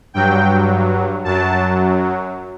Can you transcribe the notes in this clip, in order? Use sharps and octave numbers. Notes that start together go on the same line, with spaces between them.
G2 F#3 G5
F#2 F#3 A5